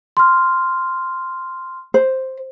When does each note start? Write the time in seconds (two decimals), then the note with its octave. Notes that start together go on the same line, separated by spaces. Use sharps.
0.17 C6 F6
1.94 C5